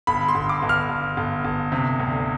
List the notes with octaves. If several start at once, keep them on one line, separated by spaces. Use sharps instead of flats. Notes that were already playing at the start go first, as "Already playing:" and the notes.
G1 B5
C6
G1
D6
G1
F6
G1
G1
G1
C3
D2